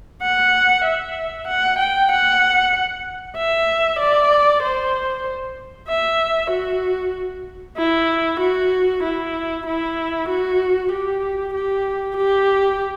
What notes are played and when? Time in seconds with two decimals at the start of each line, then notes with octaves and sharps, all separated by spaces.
0.22 F#5
0.85 E5
1.48 F#5
1.79 G5
2.11 F#5
3.37 E5
3.99 D5
4.63 C5
5.89 E5
6.51 F#4
7.77 E4
8.40 F#4
9.03 E4
9.67 E4
10.29 F#4
10.92 G4
11.54 G4
12.17 G4